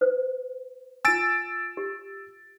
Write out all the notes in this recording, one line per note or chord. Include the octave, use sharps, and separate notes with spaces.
B4 C5
F4 G#5 E6 A6 D7
G4